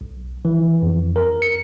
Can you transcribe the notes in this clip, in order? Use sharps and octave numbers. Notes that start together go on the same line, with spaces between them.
B1
E3
F2
A#4
C#7